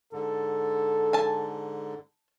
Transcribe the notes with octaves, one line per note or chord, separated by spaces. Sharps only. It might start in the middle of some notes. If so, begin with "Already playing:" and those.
G#2 D3 A4
G#5 A5